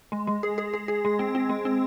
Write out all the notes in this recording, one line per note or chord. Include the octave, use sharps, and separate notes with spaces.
G#3
G#3
G#4
G#4
G#4
G#4
G#3
C4
C4
G#3
C4